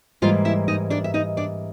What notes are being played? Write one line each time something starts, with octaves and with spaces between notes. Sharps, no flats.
G#2 E3 G3 A#3 F4 F5
E4 E5
D#4 D#5
D4 D5
E5
D#4 D#5
D4 D5